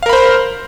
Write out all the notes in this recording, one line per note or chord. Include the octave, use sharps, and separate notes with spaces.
A#4 C5 F5 B5